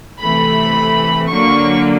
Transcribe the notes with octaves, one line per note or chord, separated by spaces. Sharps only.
C3 E3 A3 B5
D3 F#3 A#3 C#6